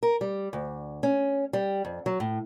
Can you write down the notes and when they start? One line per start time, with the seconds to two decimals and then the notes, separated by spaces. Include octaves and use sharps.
0.03 A#4
0.21 G3
0.53 D2
1.03 C#4
1.53 G3
1.85 F2
2.06 F#3
2.20 A2